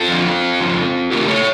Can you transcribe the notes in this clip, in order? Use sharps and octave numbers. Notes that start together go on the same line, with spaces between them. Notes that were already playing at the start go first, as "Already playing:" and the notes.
Already playing: F4 A4
E2 D3 F3
F2 C#3 F3
C#3 E3 A3 G4 A#4
A4 C#5